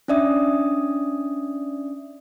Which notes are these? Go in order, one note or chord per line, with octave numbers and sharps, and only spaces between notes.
C#4 D4 D5 E5 D#6